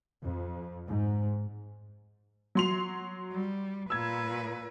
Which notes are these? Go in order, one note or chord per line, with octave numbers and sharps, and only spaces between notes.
F2
G#2
F#3 C6 F7
G3
A#2 B4 E6 G#6